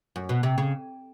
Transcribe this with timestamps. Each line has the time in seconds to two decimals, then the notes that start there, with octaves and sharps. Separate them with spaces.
0.16 F#2
0.29 B2
0.43 C3
0.58 C#3